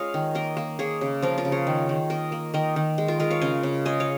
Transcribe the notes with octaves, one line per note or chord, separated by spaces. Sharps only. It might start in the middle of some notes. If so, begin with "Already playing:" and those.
Already playing: G#3 C#4 F4 G#4 C#5 D#5 F5 G#5
D#3
A#3 A#4 D#5
A#3
A#3 G#4 C#5
C#3
F3 F4 A#4
F4 A#4
C#3
G#4 C#5
D#3
D#3
A#3 A#4 D#5
A#3
D#3 A#4 D#5
D#3
G#3
F4 A#4
G#3 F4 A#4
C#5 F5
C#3 D#5 G#5
C#3
G#3 D#5 G#5
C#5 F5